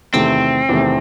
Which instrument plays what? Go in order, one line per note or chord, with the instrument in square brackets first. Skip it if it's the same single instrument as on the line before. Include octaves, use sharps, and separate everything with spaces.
[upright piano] E2 C3 D#3 A3 [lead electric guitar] C4
[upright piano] E2 C3 D#3 A3